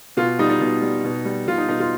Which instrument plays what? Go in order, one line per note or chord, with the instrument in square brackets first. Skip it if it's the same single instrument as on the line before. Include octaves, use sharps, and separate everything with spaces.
[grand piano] B2 F4
G3 D#4
D#4
B2
G3
B2
G3
B2 F4
D#4
B2 D#4
F4